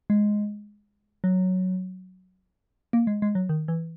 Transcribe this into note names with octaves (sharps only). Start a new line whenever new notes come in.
G#3
F#3
A#3
G#3
G#3
F#3
D#3
E3